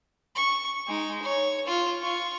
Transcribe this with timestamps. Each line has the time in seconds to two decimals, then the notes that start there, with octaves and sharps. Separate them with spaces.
0.35 C#6
0.87 G#3 D#4
1.23 C#5
1.67 F4
2.02 F4 C#6